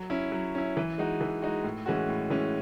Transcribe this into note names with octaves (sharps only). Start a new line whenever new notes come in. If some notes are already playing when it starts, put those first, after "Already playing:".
Already playing: F#3
C#4 E4
F#3
C#4 E4
E3
G#3 D#4 F#4
E3
G#3 D#4 F#4
A2
E3 G#3 C#4 F#4
A2
E3 G#3 C#4 F#4